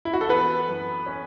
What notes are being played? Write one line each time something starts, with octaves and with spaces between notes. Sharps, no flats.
E4
F#4
A4
E3 B3 B4
F#2
C#4